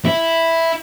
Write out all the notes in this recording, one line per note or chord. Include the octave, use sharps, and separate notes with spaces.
E4